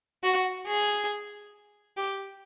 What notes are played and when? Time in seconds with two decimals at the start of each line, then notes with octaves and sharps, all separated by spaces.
0.23 F#4
0.67 G#4
1.97 G4